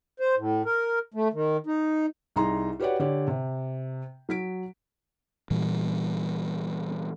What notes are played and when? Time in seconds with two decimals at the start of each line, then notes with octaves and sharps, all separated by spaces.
0.20 C5
0.37 A2
0.65 A#4
1.14 A3
1.33 D#3
1.67 D#4
2.36 C2 D#4 G#4 A#5 C6
2.80 F#4 G4 B4 C#5 D5 F#5
3.00 D3 G4 C#5 D5
3.28 C3
4.29 F#3 B6 D7
5.51 A#2 E3 G3